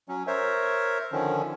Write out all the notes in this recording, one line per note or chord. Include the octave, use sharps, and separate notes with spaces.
F#3 C#4
A#4 C5 C#5 E5
D3 D#3 F3 C#4